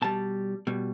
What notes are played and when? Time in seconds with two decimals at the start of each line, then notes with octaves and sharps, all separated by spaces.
0.02 B2 G3 A5
0.67 B2 G3